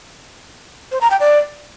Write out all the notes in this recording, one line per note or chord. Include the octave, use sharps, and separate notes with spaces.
C5
A#5
G5
D5